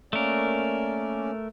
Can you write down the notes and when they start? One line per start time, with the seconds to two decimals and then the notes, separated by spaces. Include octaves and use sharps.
0.13 A3 A#3 C#4 A#4 D5